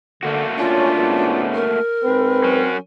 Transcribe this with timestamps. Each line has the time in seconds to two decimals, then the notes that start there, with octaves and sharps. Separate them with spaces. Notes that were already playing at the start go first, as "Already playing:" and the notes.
0.23 D3 A3 A#3 F#4
0.58 C#4 D4 F4
0.97 G#2 B3 C#4
1.54 A#4
2.04 G#2 C4 B4
2.44 F#3 C#4